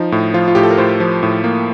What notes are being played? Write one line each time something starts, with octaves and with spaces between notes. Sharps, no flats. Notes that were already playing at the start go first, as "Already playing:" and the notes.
Already playing: F3 D#4
A2
F3 F4
F4
A2 G4
A4
A#4
A2 C5
F3
A2
A#3